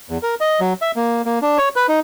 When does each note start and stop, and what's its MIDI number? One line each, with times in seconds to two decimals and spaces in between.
0.10 0.18 40
0.23 0.35 70
0.40 0.60 75
0.60 0.73 54
0.82 0.91 76
0.96 1.22 58
1.26 1.39 58
1.42 1.58 62
1.58 1.69 73
1.76 1.87 71
1.89 2.00 63